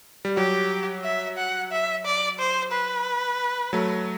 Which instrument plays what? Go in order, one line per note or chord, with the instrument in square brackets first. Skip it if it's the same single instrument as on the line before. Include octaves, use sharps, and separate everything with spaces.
[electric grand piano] G3
[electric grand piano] F#3 [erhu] G4
[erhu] E5
F#5
E5
D5
C5
B4
[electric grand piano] F#3 A3